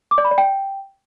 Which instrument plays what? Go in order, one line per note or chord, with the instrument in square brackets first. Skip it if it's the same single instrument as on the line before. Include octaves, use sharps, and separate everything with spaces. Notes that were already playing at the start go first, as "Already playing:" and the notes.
[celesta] D6
D5
B5
D5
G5